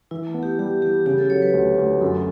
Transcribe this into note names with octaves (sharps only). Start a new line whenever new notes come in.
E3 E4
A3
B3
G4
G3 G4
E3 G4
C#3 G4
A4
F#3 C#5
B4
D2
D2
F#2 A4